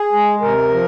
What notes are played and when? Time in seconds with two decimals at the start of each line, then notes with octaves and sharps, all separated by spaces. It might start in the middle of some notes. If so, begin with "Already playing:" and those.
Already playing: G#4
0.13 G#3
0.41 C3 A#4
0.70 F3